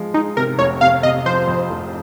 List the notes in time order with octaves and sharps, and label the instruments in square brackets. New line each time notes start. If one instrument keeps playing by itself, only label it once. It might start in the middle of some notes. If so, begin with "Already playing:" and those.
Already playing: [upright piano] F3 G#3
[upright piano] G#3 [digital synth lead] D#4
[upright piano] C3 [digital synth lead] A#4
[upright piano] F1 [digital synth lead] C#5
[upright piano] C3 [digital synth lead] F5
[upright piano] C3 [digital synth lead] D#5
[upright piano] F3 [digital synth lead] C5
[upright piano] F2
F1